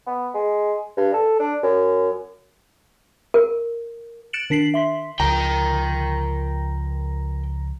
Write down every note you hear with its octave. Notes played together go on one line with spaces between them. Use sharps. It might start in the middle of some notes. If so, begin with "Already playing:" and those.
B3
G#3
G2
A4
D4
F#2
A#4
F#6 A6 C#7 D7 E7 F#7
D#3 D4 B6 C7 F#7
E5 C6 B6
C#2 F3 A#4 G5 A#5